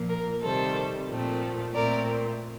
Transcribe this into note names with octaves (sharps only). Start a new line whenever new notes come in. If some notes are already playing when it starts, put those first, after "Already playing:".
Already playing: A#2 F3 A#3
A#4
C3 D#3 G3 A4 C5
A#2 F3 A3 C4
A#2 A3 C4 A#4 D5